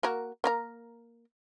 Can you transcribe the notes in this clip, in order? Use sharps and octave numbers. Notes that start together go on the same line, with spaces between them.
A#3 F#4 A#4
A#3 A#4 A#5